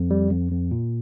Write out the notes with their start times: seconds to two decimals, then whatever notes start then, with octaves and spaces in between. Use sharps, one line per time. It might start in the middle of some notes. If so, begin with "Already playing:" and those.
Already playing: F2
0.11 G3
0.31 F2
0.51 F2
0.71 A#2